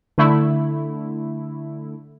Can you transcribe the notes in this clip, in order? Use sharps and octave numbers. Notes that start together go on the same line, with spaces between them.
D3 A3 E4